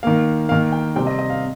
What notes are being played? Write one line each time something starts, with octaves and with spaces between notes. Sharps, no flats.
D#3 A#3 F5
D#3 A#3 F5
G5
C3 G3 C4 G5
D#5
D#5
F5